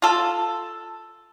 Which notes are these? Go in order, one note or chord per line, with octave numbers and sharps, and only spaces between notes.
F4 A4